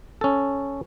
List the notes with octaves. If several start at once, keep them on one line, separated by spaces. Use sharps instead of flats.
C#4 A4